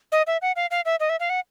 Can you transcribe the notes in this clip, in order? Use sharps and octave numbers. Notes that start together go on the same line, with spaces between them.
D#5
E5
F#5
F5
F5
E5
D#5
E5
F5
F#5